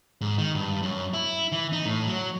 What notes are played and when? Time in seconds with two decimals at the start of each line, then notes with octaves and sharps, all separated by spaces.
0.21 G#2
0.38 D#3
0.55 G2
0.82 F#2
1.14 E4
1.52 E3
1.72 D#4
1.85 A2
2.07 F#3